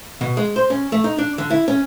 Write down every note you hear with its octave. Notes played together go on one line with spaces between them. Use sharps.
B2
G#3
C5
C#4
A3
D#4
D4
D3
E4
C#4